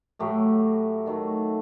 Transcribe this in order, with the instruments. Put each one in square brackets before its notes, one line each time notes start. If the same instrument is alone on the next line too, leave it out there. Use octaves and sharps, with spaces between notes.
[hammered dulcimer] A2 F#3 A3 G4
D#3 F#3 A3